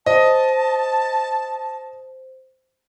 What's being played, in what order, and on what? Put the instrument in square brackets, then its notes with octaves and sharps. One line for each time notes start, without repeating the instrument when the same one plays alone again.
[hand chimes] C5 [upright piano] D#5 [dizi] A5